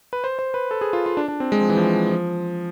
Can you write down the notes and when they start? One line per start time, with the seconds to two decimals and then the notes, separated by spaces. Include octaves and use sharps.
0.13 B4
0.24 C5
0.39 C5
0.54 B4
0.71 A4
0.81 G#4
0.93 F4
1.06 F4
1.17 D4
1.28 D4
1.40 C4
1.52 G#3
1.61 F3
1.69 E3
1.77 F3
2.11 F3